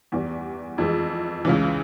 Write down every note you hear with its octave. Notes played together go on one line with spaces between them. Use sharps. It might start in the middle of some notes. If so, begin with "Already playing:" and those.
E2 E3 G3
F2 E3 G#3
C#2 C#3 E3